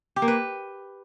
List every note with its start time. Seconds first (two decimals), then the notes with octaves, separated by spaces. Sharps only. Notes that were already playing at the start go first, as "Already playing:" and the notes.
0.16 G4
0.22 A#3
0.28 B4